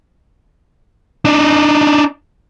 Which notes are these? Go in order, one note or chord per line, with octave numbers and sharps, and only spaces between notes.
D4 D#4